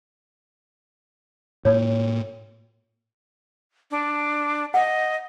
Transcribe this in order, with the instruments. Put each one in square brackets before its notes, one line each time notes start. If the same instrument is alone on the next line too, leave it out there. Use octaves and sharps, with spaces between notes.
[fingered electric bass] A2 A#3 [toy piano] C#5
[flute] D4
[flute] D#5 [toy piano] F#5